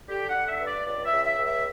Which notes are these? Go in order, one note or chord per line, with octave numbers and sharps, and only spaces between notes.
D3 G4
F#5
D3
E5
G2
D5
C#2 D5
E5
C#2
E5
C#2
E5